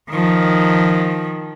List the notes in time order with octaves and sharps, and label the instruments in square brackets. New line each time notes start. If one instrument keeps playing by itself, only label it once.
[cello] D#3 F3